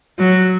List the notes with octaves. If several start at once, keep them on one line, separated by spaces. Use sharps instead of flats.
F#3